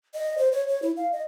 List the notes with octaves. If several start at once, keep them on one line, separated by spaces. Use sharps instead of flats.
D#5
C5
C#5
C#5
E4
F5
D#5